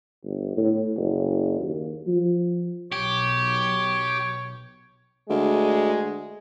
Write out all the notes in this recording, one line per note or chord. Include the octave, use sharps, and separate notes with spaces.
G1
A2
F#1
D#2
F3
B1 G4 C#5
D2 G#3